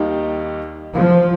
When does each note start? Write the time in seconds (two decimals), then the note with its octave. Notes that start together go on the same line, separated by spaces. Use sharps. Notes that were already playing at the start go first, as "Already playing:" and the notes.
Already playing: D#2 D#3 G3 A#3 D#4
0.95 F3